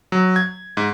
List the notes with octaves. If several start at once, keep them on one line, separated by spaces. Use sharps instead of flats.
F#3
G#6
G#2